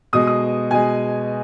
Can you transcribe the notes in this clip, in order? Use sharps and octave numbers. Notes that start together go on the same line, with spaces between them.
B2 G#3 D#6
D#6
B2 G#3 G#5